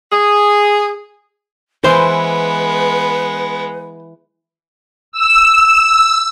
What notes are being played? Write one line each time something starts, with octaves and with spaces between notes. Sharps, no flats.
G#4
E3 G#3 B3 B4 C5
E6